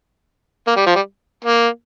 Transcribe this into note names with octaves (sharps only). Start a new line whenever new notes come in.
A#3
G3
F3
G3
A#3